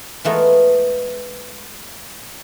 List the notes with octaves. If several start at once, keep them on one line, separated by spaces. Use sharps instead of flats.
E3 G#3 A3 B3 F4 A#4